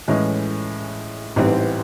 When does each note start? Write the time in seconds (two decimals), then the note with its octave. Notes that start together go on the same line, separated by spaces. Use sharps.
0.08 A2 E3 G#3 C#4
1.36 A1 G#2 E3 G3 C4